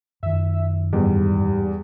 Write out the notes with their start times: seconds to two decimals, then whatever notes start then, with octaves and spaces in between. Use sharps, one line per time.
0.23 F#2 D#3 E5
0.93 E2 G#2 G3